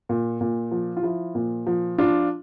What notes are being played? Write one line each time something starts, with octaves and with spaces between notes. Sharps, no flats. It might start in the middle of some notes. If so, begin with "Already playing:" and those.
A#2
A#2
F3
F4
F3 E4
A#2
F3
F3 D4 F4